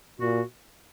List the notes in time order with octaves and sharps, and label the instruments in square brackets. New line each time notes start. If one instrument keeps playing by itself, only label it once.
[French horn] A#2 [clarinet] F#4